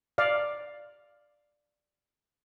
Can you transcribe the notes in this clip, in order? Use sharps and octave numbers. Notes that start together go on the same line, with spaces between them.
D5 F5